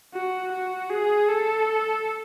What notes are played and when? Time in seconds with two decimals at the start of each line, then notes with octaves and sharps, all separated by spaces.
0.14 F#4
0.52 F#4
0.90 G#4
1.29 A4